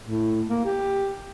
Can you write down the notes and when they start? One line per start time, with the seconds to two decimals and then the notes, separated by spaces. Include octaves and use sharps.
0.03 A2
0.49 A#3
0.65 G4